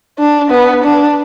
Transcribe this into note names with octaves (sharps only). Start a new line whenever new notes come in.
D4
B3
D4